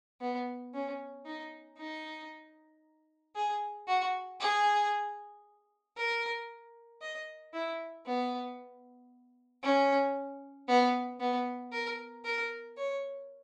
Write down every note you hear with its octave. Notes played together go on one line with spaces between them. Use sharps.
B3
C#4
D#4
D#4
G#4
F#4
G#4
A#4
D#5
E4
B3
C#4
B3
B3
A#4
A#4
C#5